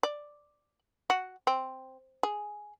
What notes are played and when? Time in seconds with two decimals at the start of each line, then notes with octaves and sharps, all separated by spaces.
0.03 D5
1.10 F#4
1.47 C4
2.23 G#4